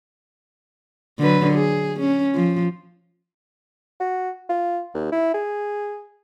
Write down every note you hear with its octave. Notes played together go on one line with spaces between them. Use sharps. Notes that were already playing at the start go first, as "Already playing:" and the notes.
D3 F#3 B4
G#4
C#4
F3
F#4
F4
D#2
E4
G#4